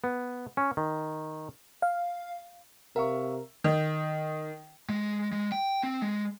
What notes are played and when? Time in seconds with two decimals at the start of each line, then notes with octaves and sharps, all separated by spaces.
0.04 B3
0.57 C#4
0.77 D#3
1.82 F5
2.96 C3 A#4 E5 F5 C#6
3.64 D#3
4.89 G#3
5.33 G#3
5.52 G5
5.83 C4
6.02 G#3